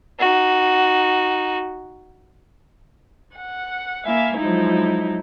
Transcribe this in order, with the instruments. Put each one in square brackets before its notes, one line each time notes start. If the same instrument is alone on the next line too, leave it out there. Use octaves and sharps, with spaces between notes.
[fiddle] D#4 F#4
[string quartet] F#5
A#3 E4 E5 F5 G#5
F3 F#3 G#3 D#4 E4